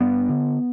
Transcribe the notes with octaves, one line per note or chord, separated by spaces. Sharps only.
G2 B3
D3